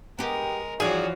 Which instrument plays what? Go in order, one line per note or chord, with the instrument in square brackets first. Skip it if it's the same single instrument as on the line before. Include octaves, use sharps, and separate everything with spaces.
[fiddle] G#3 A#4 [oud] B3 G4 [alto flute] G5
[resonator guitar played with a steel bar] G2 G#4 [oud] E3 F3 [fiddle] F#4 C#5 [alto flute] D5